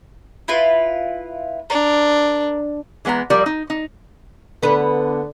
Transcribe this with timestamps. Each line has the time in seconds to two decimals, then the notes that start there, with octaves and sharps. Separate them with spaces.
0.48 E4 F4 B4
1.70 D4 A#4
3.05 E3 G#3 B3 C5 A#5
3.30 F3 G3 A#4 D5
3.46 D#4
3.70 D#4
4.63 D3 B3 B4